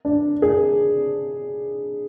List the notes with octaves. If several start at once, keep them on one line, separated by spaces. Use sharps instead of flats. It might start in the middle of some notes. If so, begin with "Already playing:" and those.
D4
G#4